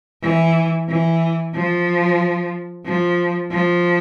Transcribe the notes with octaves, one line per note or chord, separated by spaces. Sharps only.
E3
E3
F3
F3
F3